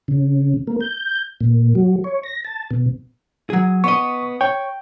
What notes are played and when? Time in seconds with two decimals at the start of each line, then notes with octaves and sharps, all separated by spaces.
0.08 C#3
0.67 A#3
0.80 G6
1.41 A#2
1.75 F#3
2.04 C#5
2.23 A#6
2.44 A5
2.71 B2
3.50 F#3 G#4
3.84 B3 D5 D#5 C#6
4.41 C#5 G5